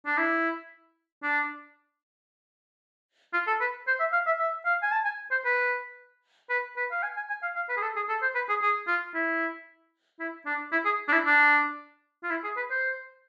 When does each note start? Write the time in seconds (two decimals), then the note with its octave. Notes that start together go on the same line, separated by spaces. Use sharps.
0.06 D4
0.17 E4
1.23 D4
3.33 F4
3.47 A4
3.61 B4
3.87 C5
4.00 E5
4.13 F5
4.27 E5
4.39 E5
4.65 F5
4.82 G#5
4.92 A5
5.05 G#5
5.31 C5
5.45 B4
6.50 B4
6.76 B4
6.91 F5
7.03 G#5
7.17 G#5
7.29 G#5
7.42 F5
7.55 F5
7.69 B4
7.77 G#4
7.82 A4
7.96 G#4
8.09 A4
8.22 C5
8.35 B4
8.49 G#4
8.62 G#4
8.87 F4
9.14 E4
10.19 E4
10.46 D4
10.72 E4
10.85 G#4
11.08 D4
11.12 E4
11.26 D4
12.23 F4
12.30 E4
12.44 G#4
12.57 B4
12.70 C5